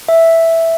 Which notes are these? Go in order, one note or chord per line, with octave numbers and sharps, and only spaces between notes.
E5